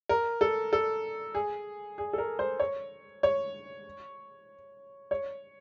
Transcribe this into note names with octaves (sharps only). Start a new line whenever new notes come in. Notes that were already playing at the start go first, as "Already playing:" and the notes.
A#4
A4
A4
G#4
G#4
A4
A#4
C5
C#5
C#5
C#5